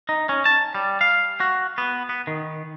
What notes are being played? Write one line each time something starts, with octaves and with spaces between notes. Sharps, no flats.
D#4
C#4
A5
G3
F5
F#4
B3
B3
D#3